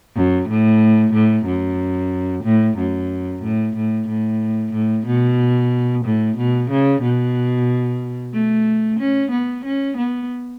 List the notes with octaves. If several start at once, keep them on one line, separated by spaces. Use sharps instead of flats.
F#2
A2
A2
F#2
A2
F#2
A2
A2
A2
A2
B2
A2
B2
C#3
B2
A3
C#4
B3
C#4
B3